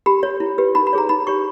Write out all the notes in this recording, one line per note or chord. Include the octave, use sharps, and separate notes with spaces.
G4 B5
C#5
E4
G4 B4
D#4 B5
B5
G#4 C#5 A#5
D#4 B5
G4 C#5 C#6